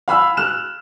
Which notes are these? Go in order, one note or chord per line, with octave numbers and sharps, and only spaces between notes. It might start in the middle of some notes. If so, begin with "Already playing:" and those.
F5 G#5 B5 E6 F6
F6 F#6 E7